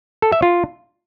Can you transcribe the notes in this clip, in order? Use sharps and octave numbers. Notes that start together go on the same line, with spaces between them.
A4
E5
F4